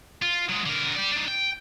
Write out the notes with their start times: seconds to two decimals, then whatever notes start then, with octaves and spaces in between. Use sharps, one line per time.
0.22 F4
0.49 F#3 G#3
0.66 D3 A#4
0.97 G4 D5
1.12 D4 D#4
1.28 G5